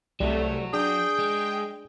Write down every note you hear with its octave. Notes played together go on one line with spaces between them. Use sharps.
C2 F#3 G3 A3 F#4
D4 G#4 G5
G#3